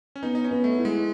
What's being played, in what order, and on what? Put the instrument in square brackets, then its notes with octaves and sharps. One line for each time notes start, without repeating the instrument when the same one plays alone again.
[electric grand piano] C#4
[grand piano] B3 [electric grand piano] D#4
[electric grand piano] D#4
C#4
[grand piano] B3
[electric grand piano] A3
[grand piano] E4
[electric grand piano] G#3